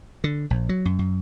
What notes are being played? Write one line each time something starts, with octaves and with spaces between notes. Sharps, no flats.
D3
A#1
F#3
F#2
F#2